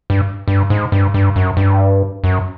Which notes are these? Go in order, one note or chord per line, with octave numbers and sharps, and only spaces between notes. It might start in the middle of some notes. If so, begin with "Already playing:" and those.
G2
G2
G#2
G2
G2
F#2
G2
F#2